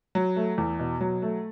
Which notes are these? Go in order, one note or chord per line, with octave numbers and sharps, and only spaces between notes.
F#3
A3
E2
B2
F#3
A3